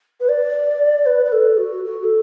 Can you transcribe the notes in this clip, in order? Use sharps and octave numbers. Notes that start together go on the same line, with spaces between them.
B4
D5
B4
B4
A4
F#4
F#4
A4